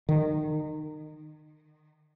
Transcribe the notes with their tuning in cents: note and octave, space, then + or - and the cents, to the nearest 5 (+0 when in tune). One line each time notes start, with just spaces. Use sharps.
D#3 -30